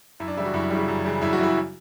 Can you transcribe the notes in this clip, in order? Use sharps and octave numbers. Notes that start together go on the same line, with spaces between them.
F#2 E4
D4
C#3 E3 G3 E4
F#4
F#2 E4
C#3 E3 G3
F#2
C#3 E3 G3
F#2 E4
F#4
C#3 E3 G3 E4